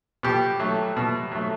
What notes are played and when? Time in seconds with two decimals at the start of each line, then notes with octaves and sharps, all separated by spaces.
0.23 B2 G4
0.60 F#3 A3
0.97 B2
1.32 F#3 A3